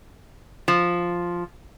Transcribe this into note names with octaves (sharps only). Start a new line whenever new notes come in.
F3